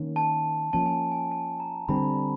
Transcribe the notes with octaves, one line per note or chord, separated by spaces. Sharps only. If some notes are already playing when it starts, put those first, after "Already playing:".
Already playing: D#3 A#3 C#4
A5
F3 A#3 C#4 A5
G#5
G#5
A5
A#5
D3 G3 C4 B5